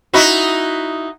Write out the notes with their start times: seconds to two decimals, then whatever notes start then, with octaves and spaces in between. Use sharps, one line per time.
0.14 D#4 E4 F#4